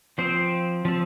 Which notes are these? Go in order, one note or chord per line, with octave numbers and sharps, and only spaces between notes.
F3 C4 C5
F3 C4